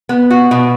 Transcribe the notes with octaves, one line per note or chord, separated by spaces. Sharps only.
B3
F#4
B2